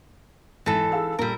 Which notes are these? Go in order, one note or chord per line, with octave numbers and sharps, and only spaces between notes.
G#1 E3 A4
G#4 F5 E6
A#1 G3 A#4